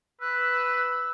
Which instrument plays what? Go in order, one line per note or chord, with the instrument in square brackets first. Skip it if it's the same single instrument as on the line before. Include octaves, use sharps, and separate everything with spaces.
[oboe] B4 [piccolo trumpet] E6 [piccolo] F#6